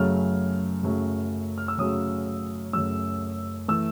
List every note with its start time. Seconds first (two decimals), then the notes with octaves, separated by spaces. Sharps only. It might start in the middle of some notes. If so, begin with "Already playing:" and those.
Already playing: F#2 C#3 F#3 A3 F6
0.83 F#2 C#3 F#3 A3
1.58 F6
1.68 E6
1.78 F#2 C#3 F#3 A3 D#6
2.73 F#2 C#3 F#3 A3 E6
3.68 E3 A3 E6